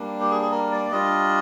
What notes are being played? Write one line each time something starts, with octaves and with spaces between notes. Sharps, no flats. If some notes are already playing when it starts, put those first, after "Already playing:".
Already playing: G3 A#3 D4
G4
G#4
G#4
A#4
D5
G3 D4 F4 D#5